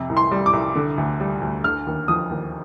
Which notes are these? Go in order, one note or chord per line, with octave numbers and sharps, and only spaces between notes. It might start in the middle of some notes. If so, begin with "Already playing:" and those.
Already playing: F2 C3
C2
C6
G3
D6
C2
D3
D2
G3
D2
D3 F6
D#2
F3 D#6
D#2